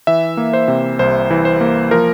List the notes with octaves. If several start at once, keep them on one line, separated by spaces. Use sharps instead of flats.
E3 E5
A#3
C5
C3
C2 C5
E3
C5
A#3
F3 A#4